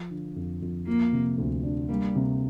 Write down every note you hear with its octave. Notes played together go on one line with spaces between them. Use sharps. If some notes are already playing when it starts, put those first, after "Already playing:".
Already playing: F3
D3
F2
F2
F3 A#3
C3
D2
D4
G3 A#3
C3